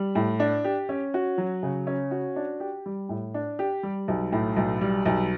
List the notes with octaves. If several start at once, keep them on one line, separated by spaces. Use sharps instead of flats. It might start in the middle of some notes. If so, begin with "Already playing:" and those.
Already playing: G3
A2
D4
G4
C#4
F#4
F#3
C#3
C#4
F#4
D4
G4
G3
A2
D4
G4
G3
B1
A2
B1
G3
B1